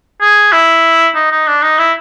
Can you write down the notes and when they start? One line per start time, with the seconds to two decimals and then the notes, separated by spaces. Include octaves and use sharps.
0.21 G#4
0.52 E4
1.15 D#4
1.31 D#4
1.47 D4
1.63 D#4
1.79 E4